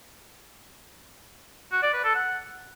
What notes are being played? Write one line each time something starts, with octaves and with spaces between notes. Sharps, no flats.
F#4
D5
B4
A4
F#5